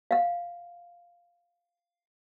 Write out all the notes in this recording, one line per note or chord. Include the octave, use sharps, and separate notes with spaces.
F5 F#5